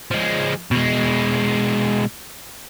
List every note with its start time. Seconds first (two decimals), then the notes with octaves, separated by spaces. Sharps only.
0.11 F3 G#3
0.71 B2 G#3